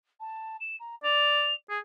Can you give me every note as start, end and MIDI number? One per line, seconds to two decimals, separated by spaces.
0.20 0.57 81
0.60 0.76 100
0.80 0.95 82
1.04 1.51 74
1.04 1.53 101
1.70 1.79 68